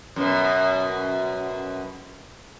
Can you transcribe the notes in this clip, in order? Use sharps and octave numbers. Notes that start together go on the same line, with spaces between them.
F#2 B2